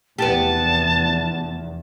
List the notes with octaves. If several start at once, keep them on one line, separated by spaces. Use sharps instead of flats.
F1 E2 B3 G4 A5